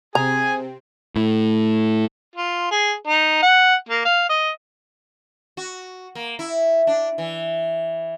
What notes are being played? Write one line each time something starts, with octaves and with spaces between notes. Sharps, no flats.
C3 C4 G#4 G#5 A#5
A2
F4
G#4
D#4
F#5
A#3
F5
D#5
F#4
A#3
E4
D4
E3